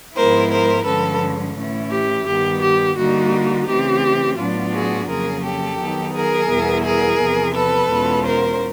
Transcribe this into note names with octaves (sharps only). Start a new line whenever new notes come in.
G#2 F3 G#3 B3 E4 A#4 C5
A#4 C5
G2 D3 F3 G#3 C#4 A4 B4
A2 E3 A3 C#4 E4
G4
G2 D#3 G3 B3 G4
G4
D3 G3 A#3 D#4 F#4
C#3 E3 A3 C4 G4
A2 F#3 B3 D4 F4
F#4 G#4
F2 C#3 F#3 A#3 G#4 A#4
G4 A4
D#3 F#3 B3 D#4
G#4 A#4
E2 B2 G3 B3 E4
G#4 A#4
E2 C3 F3
A4 B4
E2 B2 G#3 C#4 F4
A#4 C5